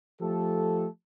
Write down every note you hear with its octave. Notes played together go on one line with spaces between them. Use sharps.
F3 A3 G4 A4